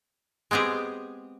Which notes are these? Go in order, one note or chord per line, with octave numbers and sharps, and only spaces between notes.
G#3 B3 C4 G4 G#4